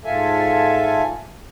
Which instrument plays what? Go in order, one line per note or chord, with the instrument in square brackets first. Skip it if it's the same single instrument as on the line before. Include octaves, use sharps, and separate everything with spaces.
[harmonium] G#2 F4 A4 E5 G#5